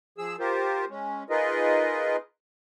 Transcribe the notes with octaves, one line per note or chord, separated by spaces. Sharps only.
F3 G#4 E6
F4 G4 A#4 C5
G#3 C#4
D#4 F4 G#4 A#4 B4 D#5